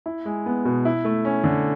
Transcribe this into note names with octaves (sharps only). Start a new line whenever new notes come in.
E4
G#3
B3
B2
E4
A3
C#4
D3